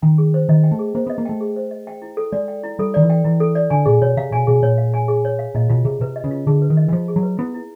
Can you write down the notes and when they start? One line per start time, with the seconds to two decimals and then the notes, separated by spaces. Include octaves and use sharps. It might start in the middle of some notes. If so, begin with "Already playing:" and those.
0.02 D#3 G5
0.18 G#4
0.34 C5
0.49 D#3 D#5
0.64 G5
0.71 A3
0.79 G#4
0.95 A#3 C5
1.07 B3 D#5
1.18 A#3
1.25 A3 G5
1.41 G#4
1.56 C5
1.71 D#5
1.87 G5
2.02 E4
2.17 A4
2.32 G#3 D5
2.48 G5
2.64 E4
2.79 G3 A4
2.94 D#3 D5
3.02 E3
3.10 G5
3.24 E3 E4
3.40 A4
3.55 D5
3.70 D3 G#5
3.86 A#2 G#4
4.02 B2 C#5
4.17 C3 F5
4.32 B2 G#5
4.47 B2 G#4
4.63 A#2 C#5
4.78 F5
4.94 G#5
5.08 G#4
5.25 C#5
5.39 F5
5.55 A#2 D#5
5.70 B2 F4
5.85 C3 G#4
6.01 C3 B4
6.16 D#5
6.24 C#3
6.31 F4
6.47 D3 G#4
6.62 B4
6.70 D#3
6.77 D#5
6.88 E3
6.92 F3 F4
7.08 G#4
7.16 F#3
7.23 B4
7.39 B3 E4
7.54 E4